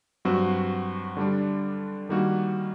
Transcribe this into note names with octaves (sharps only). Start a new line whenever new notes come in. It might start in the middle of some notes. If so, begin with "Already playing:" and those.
G2 F#3 C4 F#4
D3 G3 D4
D#3 G3 A#3 F#4